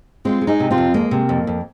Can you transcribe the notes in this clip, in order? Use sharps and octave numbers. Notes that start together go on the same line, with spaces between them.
G#3 C4 F4
G#3
D#4 G#4
C3
C4 F4
F2
G#3 A#3
C3
F2
F2